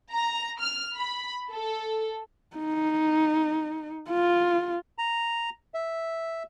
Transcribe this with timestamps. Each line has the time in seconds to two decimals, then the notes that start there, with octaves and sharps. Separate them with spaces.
0.11 A#5
0.60 F6
0.96 B5
1.50 A4
2.56 D#4
4.10 F4
4.98 A#5
5.74 E5